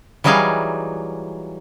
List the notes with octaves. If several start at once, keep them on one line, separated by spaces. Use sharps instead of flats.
E3 F#3 G3 D#4 G#4 F5